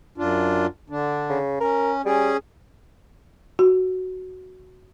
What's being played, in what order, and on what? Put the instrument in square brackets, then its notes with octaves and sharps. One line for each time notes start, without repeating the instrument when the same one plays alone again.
[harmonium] F#2 D4 F4
D3 D4
[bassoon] C#3
[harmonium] C#4 [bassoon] A#4
[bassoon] G3 [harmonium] C#4 G#4
[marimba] F#4